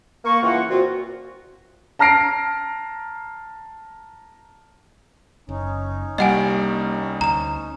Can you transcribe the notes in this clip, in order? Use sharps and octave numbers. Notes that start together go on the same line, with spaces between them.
A#3 C#6
C#2 E3 A#3 F4 F#5
A#2 C4 F4 F#4
A5 A#5 F6 A#6 C7 D7
F#1 C#4 D#4
C2 G3 A#3 D#5 F#5 G#5 D7
D2 A#5 E7